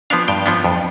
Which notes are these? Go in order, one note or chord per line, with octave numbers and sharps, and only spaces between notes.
F3 B3 D4 F5
G2 G5
F3 B3 D4
F2